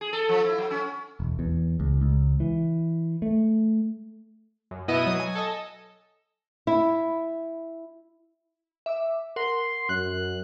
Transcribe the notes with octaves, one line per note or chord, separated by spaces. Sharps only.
G#4
A4
F3
E4
F#3
C#4
E1
E2
C#2
C#2
E3
A3
F#2
B2 B3 E4 D#5 D#7
F#3 D#6
G#5
A4 D#5
E4
E5 D6 E6
A#4 F#5 C6
F#2 F#6